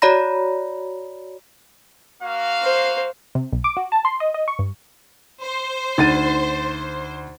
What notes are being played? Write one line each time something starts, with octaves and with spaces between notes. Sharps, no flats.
F#4 C#5 D5 A#5 B5 A#6
A#3 F#4 F5
C5
C3
B1
D6
F#4
A5
C6
D#5
D#5
C#6
G2
C5
D2 D#4 A6 D#7